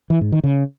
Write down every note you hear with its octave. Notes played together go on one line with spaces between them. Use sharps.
E3
G#2
D#3
C#3